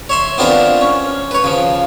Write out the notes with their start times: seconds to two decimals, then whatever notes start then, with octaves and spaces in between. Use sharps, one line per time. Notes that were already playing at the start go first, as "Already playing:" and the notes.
0.09 C#5 E5 C6
0.38 B3 C4 D4 F4 A#4 E5
0.81 C#4
1.31 B4 C#5
1.44 C#3 F3